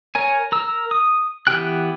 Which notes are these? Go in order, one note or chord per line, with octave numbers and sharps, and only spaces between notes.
A#4 C#5 G#5
A#4 E6
D#6
E3 B3 G4 G5 F#6